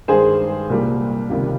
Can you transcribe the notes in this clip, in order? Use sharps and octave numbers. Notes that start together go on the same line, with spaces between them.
G2 D#3 G#3 G#4 C5
C2 A#2 G3 A#3
C#2 C3 D#3 G3